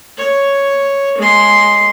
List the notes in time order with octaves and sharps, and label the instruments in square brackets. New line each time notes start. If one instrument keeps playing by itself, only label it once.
[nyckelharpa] C#5
G#3 C6